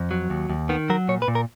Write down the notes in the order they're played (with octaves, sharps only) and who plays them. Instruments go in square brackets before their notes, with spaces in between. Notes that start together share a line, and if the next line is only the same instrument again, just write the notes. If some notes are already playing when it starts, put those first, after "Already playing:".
Already playing: [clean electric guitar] F2
F#3
D#2
D#2
D#3 B3
F#3 A#4
A#2 C#5
B4
A#2
A#4